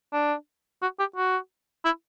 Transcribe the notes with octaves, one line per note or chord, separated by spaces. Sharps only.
D4
F#4
G4
F#4
E4